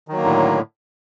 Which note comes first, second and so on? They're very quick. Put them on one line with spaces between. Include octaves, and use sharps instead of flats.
D#3 F#3 A#3 D3 A2